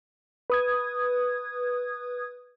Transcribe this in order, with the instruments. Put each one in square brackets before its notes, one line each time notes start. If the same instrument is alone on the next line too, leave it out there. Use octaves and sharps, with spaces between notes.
[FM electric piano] B4 D#6 G#6